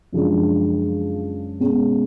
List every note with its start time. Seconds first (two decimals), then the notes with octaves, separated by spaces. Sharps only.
0.12 F#2 C#3 F3 G#3 D4
1.60 B2 G#3 C#4